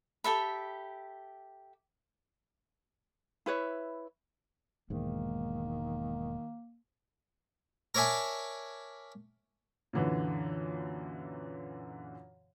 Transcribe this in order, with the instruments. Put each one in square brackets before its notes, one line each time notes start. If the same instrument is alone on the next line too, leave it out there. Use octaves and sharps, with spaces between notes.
[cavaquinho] G4 A4 E5 B5
[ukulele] E4 B4 C#5 E5
[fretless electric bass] E1 G#2 [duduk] D#3 [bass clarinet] A#3
[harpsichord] A#4 C#5 D5 E5 G#5 A5
[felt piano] F#2 A#2 D3 E3